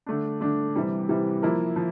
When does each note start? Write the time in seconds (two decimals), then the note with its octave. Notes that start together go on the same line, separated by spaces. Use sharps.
0.06 D3 A3 D4
0.41 D3 A3 D4
0.75 C3 E3 G3
1.09 C3 E3 G3
1.42 F3 A#3 E4
1.76 F3